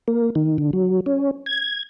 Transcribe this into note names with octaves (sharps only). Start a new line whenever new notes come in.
A#3
D#3
D3
F#3
C#4
G#6